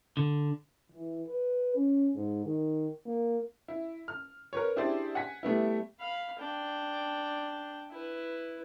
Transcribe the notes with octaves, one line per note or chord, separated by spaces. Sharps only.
D3
E3
B4
C#4
G#2
D#3
A#3
E4
F6
A#4 B4 C#5
D4 E4 G4 G#4 C5 D5
F#5 G#5 B6
G3 A3 B3 E4
F5 B5
D4 G5
E4 B4